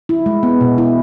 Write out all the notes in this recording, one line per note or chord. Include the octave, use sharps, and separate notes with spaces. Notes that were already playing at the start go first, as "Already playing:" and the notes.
E4
G#3
B3
B2
E4